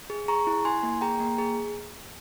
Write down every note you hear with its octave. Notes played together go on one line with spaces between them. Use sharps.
G#4
G#4 A#5 C#6
E4
E4 G#5 C6
A#3
G#4 G5 A#5
A#3
G#4